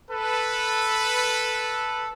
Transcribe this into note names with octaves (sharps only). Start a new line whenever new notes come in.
A4 B4